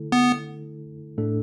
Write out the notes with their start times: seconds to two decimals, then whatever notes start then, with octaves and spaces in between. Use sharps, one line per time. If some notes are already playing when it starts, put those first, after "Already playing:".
Already playing: D3 A3 E4 A4
0.12 B3
1.18 A2 A3 D4 A4